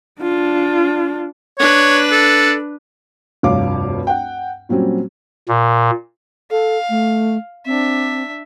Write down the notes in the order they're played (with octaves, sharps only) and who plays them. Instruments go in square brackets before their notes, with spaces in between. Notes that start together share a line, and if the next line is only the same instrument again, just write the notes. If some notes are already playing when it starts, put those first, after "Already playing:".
[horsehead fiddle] D4 F4
[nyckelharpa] D4 B4 [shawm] C#5
[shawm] A4
[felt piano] F1 D2 G2 C#5 F5 D6
F#5 G5
A#2 F#3 G3 C4 C#4
[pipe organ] A#2
[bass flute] A4 [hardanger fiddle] F5
[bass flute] A3
[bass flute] C4 [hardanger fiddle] D4 E5